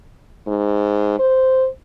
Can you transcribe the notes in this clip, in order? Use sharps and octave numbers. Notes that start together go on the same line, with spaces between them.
G#2
C5